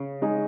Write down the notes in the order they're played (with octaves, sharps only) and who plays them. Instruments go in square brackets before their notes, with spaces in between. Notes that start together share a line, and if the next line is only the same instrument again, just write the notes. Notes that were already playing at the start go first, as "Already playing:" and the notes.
Already playing: [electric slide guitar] C#3
[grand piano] G#3 D#4 G#4